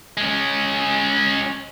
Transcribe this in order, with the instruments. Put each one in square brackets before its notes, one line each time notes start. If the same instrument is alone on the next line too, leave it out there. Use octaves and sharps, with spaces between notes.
[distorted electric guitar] G#3 C#4